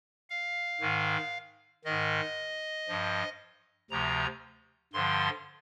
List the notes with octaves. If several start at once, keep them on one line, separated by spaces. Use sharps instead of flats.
F5
G#2 D#3
G#2 D#3 D#5
G2 F3
D2 C3 F3 A#5
G2 D3 F3 C6